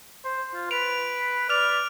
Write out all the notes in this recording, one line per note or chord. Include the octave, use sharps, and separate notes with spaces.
C5
F4
B4 D7 F7
D5 F6 F7